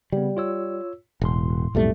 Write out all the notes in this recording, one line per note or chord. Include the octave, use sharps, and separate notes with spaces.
C#3 G3 B3
F4 C#5 E6
E1 A2 C6
B1 F2 A2 G3 A3